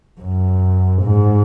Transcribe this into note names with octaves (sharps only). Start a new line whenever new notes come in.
F#2
G#2